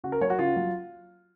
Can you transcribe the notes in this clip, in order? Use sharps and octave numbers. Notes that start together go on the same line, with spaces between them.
C#3 F#4
A#4
F#3 C#5
F#4
C#3 F4
F#3